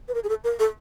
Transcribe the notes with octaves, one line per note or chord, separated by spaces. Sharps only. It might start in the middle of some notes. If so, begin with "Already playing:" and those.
B4
A#4
G#4
A4
A#4
A4